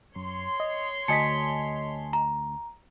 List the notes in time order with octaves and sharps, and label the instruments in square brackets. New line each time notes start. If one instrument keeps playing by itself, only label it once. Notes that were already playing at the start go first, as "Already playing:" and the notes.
[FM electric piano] F#2 [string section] C#5 C6
[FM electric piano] D#5
[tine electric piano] D2 [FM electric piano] D#5 G#5 A5 [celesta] B6 C#7
[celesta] A#5